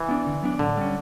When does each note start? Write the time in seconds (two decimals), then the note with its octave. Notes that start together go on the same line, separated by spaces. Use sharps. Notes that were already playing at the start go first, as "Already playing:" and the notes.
Already playing: E3
0.09 B3 D4
0.26 D3
0.43 F#3 B3 D4
0.59 A2 D3
0.77 G3 C#4